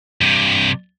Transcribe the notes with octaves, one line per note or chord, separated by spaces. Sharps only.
G2 C3